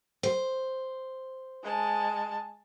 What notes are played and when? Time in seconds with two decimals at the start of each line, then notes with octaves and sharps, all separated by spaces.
0.23 C5
1.63 G#3 A5